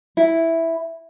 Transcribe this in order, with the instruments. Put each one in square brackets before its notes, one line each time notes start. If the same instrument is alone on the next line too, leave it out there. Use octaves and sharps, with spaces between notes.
[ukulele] E4